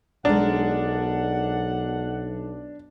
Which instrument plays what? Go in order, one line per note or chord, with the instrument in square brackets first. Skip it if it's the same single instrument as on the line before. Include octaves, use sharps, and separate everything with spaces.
[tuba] B1 [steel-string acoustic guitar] G#3 A#4 [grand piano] D4 [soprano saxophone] F#5